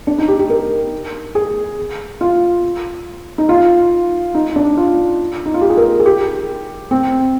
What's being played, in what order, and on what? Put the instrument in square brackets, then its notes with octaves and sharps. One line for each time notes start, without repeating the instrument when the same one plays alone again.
[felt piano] D4
D#4
G4
G4
A#4
G#4
F4
D#4
F4
D#4
D4
F4
D#4
F4
G4
G#4
A#4
G#4
G4
C4